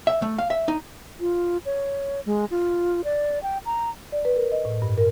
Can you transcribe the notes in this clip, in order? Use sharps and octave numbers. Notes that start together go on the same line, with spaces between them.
E5
A3
F5
E5
D#4
F4
C#5
G#3
F4
D5
G5
A#5
D5
B4
A#4
D#5
A2
G2
A#4